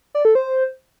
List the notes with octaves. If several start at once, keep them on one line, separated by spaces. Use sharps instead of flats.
D5
A4
C5